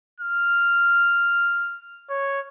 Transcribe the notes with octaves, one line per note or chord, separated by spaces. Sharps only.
F6
C#5